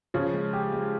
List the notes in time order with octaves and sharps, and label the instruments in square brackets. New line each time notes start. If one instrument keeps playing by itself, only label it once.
[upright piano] C#3 F3 [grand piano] C#4
[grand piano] G#3
G4
G#3